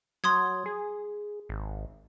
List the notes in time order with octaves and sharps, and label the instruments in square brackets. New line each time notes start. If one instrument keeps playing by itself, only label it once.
[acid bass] F#3 [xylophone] C6 D#6 G#6
[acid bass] G#4
G#1